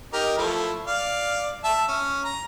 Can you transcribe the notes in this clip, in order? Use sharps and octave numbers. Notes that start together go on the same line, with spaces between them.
D#4 G4 A#4
F3 A3 E4
D5 F5
E5 A5
C#4
A#5